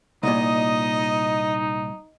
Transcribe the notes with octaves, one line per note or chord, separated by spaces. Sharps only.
C2 A#2 D#4 D#5